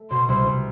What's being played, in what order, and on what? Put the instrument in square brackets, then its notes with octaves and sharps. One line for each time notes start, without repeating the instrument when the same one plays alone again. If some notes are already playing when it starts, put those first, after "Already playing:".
Already playing: [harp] A3
[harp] B2 [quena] C6
[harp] C2 [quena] C6
[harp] C2